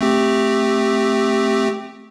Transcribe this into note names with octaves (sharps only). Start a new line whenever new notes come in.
A3 C4 G4